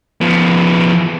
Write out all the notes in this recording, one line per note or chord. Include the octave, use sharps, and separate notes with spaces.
F3 B3